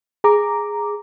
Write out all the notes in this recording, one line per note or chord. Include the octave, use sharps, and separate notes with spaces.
G#4 A#5 D6